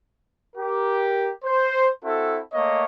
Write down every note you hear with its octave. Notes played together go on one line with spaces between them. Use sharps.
G4 A#4
C5
C4 E4 F#4 A4
A3 A#3 C#5 D#5